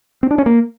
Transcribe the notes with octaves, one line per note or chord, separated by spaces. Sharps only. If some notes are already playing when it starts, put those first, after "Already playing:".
C4
D4
C#4
A#3